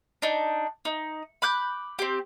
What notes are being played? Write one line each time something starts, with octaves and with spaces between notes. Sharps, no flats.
D4 D#4
D#4
B5 D6 F#6 G6
C4 G4